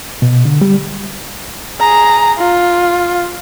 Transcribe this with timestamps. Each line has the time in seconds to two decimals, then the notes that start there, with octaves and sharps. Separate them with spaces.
0.22 B2
0.45 D3
0.61 G3
1.80 G#4 A#5
2.38 F4